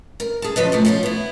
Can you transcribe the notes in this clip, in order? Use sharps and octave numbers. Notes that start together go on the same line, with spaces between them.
A#4
G#4 A5
C#3 F3 D4 B4 D#5
G#2 F3 A3
F3 B3 C#4 E4 F4 C5
B3 E4